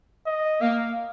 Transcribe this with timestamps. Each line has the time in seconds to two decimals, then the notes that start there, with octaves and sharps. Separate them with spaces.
0.27 D#5
0.61 A#3 F5